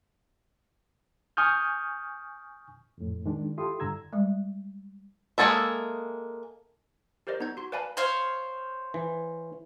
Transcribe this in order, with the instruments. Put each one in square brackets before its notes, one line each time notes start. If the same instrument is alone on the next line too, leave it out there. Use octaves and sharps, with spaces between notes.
[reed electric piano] G#5 C#6 D#6 F6 G6
F2 A2
D#3 G#3 D4
E4 F4 G4 A4 C6 D#6
G2 D3 A#5 E6 G#6
[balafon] G3 G#3
[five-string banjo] G#3 A#3 G#4 A4 E5
[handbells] G4 A#4 C5 D5 D#5
B3 D#4 A#5 G6 G#6
F#4 C6
B4 D5 F5 G#5 A5 B5
[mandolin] C5 C#5 F5
[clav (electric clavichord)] E3